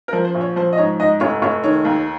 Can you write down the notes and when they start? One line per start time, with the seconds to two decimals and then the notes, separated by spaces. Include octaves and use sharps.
0.08 A#4
0.13 F3
0.25 C5
0.35 A#1
0.41 C#5
0.56 F3 C5
0.73 D#5
0.78 G#2 C#5
1.00 G#2 D#5
1.20 F1 C#5
1.42 F1 C#5
1.64 D#3 C#5
1.85 D#2